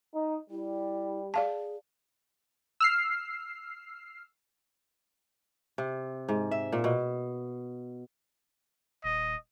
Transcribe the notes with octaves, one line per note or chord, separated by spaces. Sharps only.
D#4
G3 E4
G#4 D5 F5 A5
E6 F6 C7
C3
G#2
E5
A#2
B2
D#1 D#5